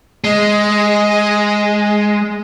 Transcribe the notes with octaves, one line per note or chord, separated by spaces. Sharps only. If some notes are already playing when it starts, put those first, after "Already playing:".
G#3 D#5